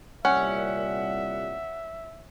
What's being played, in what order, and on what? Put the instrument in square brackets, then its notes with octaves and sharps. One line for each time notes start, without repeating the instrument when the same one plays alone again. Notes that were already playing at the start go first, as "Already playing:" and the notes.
[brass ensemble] C2 A#2 G3 [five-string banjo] C#4 [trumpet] E5 [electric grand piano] F#5